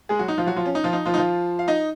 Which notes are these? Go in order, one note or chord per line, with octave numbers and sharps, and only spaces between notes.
G#3 G#4
F#3 F#4
D#4
F3 F4
F#3 F#4
F3 F4
C#4
D#4
F3 F4
D#4
F3 F4
D#4
F3 F4
F5
D#4 D#5